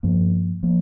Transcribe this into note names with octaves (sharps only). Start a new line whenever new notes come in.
G2 F3 A#3
F3 A#3